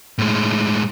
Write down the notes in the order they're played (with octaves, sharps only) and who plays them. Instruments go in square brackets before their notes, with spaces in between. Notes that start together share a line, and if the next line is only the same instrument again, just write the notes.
[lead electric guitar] A2 G#3